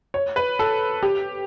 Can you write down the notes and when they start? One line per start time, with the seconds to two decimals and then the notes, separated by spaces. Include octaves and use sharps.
0.14 C#5
0.36 B4
0.59 A4
1.03 G4